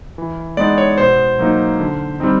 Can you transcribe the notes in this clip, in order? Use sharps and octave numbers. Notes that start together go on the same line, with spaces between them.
E3
G#3 B3 D#4 D5
C#5
B2 C5
F#3 A#3 D#4
D3
G3 C4 D#4